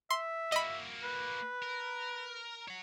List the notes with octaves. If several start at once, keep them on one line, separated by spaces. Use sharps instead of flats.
E5 C6
A#3 F#4 D#5 B5
B4
A#4
C#5 F#5